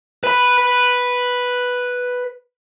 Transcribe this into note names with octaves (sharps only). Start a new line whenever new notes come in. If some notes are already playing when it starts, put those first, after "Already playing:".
B4 B5